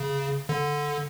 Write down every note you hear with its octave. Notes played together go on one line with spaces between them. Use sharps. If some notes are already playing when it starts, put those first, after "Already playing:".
Already playing: C#3
D3